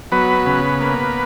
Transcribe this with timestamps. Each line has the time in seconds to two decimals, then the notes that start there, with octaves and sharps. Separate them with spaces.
0.12 F#3 B3 B4
0.46 C#3
0.81 A#3